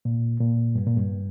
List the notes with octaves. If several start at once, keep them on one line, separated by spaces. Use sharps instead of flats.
A#2
A#2
G2
A#2
G2